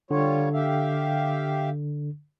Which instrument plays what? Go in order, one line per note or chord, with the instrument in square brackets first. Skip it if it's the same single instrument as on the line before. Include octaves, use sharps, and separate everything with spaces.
[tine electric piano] D3 [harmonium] G3 F4 C#5
[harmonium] G4 E5 F5